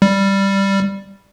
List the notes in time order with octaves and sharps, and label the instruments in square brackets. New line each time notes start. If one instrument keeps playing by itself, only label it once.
[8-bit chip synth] G3